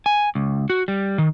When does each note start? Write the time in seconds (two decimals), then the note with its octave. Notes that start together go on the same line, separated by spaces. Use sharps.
0.06 G#5
0.35 C#2
0.70 F#4
0.88 G3
1.18 D#3